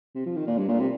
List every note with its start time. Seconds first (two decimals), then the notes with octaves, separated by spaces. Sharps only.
0.15 C3
0.26 F3
0.36 D#3
0.47 A#2
0.58 G2
0.69 A#2
0.80 C3